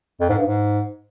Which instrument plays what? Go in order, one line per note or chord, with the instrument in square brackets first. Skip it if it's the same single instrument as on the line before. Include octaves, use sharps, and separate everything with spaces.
[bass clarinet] F2
G#2
G2
G#2